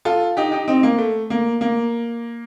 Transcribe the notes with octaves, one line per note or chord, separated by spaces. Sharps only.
F4 A4
D#4 G4
D#4 G4
C4 D#4
A#3
A3
A#3
A#3